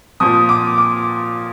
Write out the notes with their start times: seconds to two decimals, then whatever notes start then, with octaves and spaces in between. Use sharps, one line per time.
0.20 A#2 F3 D#6
0.49 D6
0.78 D6